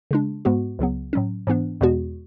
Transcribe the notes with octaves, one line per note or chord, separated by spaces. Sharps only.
C#3 G#3 D4
G#2 G#3 B3 F#4
C#2 C#3 F#3 B3
A2 F#3 C#4
G#2 E3 B3 D4
E2 B2 G#3 B3 F#4